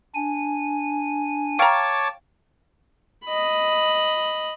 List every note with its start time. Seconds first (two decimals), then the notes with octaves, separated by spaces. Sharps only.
0.15 D4 G#5
1.59 C#5 F5 G5 A5 A#5 C#6 D6 F6
3.25 D#5 B5